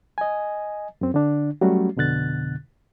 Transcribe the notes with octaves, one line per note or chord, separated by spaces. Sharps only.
D#5 G#5
F#2 C4
D3 D4
F#3 G3 A3 C#4 F#4
F2 B2 D3 F#6 A6